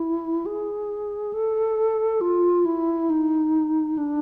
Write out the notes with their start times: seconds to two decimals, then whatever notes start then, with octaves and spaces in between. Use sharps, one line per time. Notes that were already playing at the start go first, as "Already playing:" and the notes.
Already playing: E4
0.46 G#4
1.33 A4
2.21 F4
2.65 E4
3.10 D#4
3.98 D4